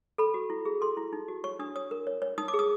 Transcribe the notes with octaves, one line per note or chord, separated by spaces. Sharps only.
A4 B5
F#4
E4
G#4
A4 C6
E4
D#4
F#4
C#5 C#6
D4 D#6
C#5 D#6
A#4
C#5
C#5
D#4 D#6
D6
G#4
D#6